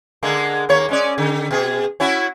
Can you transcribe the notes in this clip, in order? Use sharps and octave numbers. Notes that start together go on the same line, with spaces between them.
D3 G#3 A#3
D#2 A#3 C#5
G#3 C#4 D5
D3
B2 G#4
C#4 E4 F#4